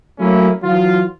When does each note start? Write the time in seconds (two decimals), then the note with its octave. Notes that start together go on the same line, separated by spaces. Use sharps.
0.19 F#3 A3 A#3 C#4 E4
0.63 E3 F#3 F4